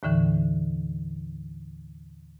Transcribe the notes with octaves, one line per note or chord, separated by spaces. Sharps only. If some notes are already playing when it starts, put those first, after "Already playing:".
D#2 A2 D3 E3